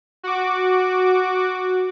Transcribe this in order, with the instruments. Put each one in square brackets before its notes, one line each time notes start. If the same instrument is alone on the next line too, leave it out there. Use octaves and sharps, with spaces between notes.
[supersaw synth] F#4 D6